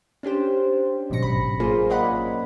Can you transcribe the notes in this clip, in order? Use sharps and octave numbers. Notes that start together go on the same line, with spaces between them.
C#4 D4 G4 C5
G#1 G#2 B2 F#3 A#6 C#7
A1 B5
A#3 F4 G#4 C5
A#4 D5 D#5 F#5 B5
C#4